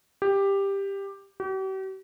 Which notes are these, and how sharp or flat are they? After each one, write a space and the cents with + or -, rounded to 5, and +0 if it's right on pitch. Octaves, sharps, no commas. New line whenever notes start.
G4 +10
G4 -45